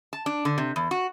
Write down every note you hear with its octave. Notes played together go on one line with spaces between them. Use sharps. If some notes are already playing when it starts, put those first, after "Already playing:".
A5
D4
D3
C3
E2
F#4